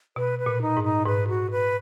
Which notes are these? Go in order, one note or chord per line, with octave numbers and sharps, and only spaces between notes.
B2 B4
B4
A#2
D#4
G#2
D#4
G#2 B4
F#4
B4